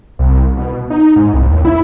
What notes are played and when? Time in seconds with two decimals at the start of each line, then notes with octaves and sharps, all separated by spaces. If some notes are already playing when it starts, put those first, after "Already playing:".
0.19 C2
0.57 B2
0.90 D#4
1.16 G#2
1.34 C2
1.49 D#2
1.65 E4